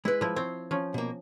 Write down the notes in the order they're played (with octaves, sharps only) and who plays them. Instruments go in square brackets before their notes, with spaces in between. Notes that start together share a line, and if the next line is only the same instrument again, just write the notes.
[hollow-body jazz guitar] G#3 B4 [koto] E4
[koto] F3 E4
[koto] C4 [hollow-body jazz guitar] C5 C#5
[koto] F3 C#4
[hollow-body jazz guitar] B2 A#3